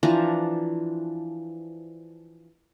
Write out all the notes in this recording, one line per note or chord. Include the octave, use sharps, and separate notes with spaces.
E3 F3 D4 A#5